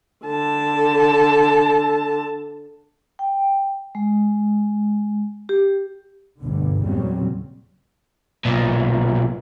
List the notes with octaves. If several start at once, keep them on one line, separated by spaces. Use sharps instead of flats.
D3 A5
G5
G#3
G4
G1 D2 G2 B2 D3
E2 A#2 C#3 F#3 G3 C4
B1 A#2